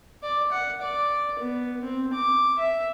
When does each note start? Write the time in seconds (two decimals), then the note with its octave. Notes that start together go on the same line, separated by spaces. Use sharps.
0.23 D5
0.52 F#5
0.82 D5
1.40 B3
1.82 C4
2.13 D6
2.58 E5